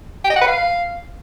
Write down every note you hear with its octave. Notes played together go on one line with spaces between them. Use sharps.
G5
D#5
F#5
B4
F5